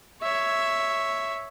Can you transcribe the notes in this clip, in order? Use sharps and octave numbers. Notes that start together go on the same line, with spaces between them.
C#5 E5